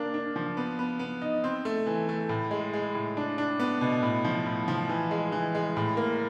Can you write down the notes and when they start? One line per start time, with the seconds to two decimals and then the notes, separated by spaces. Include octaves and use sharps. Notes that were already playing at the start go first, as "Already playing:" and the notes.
Already playing: A#3 D4
0.14 D4
0.36 F3
0.57 B3
0.79 B3
0.99 B3
1.22 D#4
1.44 C4
1.65 A3
1.87 E3
2.09 A3
2.29 A2
2.51 G#3
2.74 G#3
2.95 A2
3.17 D4
3.38 D4
3.60 B3
3.81 B2
4.03 A2
4.24 F3
4.46 A2
4.68 F3
4.89 E3
5.11 G#3
5.32 E3
5.55 G#3
5.77 A2
5.97 A#3